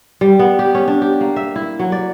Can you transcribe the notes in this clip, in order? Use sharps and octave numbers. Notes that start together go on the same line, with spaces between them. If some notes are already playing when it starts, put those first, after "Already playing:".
G3
B3
G4
C#4
D4
G4
A#3
E5
E4
F#3
D5